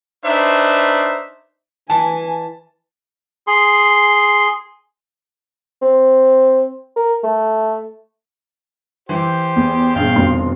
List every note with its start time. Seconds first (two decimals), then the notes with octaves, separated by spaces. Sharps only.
0.24 D4 D#4 B4 C5 E5
1.90 E3 G#5 A5
3.47 G#4 C6
5.82 C4
6.96 A#4
7.24 A3
9.09 E3 G4 C5
9.56 E2
9.95 A#1 G2 C#3 F5 G5
10.15 F1 G2 B2 D#3 C6